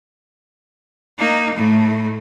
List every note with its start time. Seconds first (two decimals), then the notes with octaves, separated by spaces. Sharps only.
1.18 A#3 D#4
1.55 A2 A3